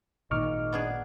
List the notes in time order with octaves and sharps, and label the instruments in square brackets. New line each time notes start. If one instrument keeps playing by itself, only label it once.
[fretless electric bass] G#1 A#2 D#3 [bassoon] D#4 [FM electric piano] C#6 D6 F6
[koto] B3 D4 G#4